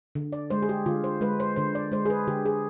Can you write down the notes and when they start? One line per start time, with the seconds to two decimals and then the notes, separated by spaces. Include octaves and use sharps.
0.15 D3
0.33 D5
0.50 G#3 C5
0.63 G#4
0.69 G4
0.86 D3 F4
1.04 C5
1.21 G#3 B4
1.40 C5
1.56 D3 C5
1.75 D5
1.92 G#3 C5
2.05 G#4
2.10 B4
2.27 D3 G4
2.46 G#4